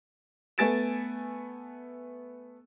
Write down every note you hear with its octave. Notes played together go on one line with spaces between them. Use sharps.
A3 B3 G#5 A6 D7 E7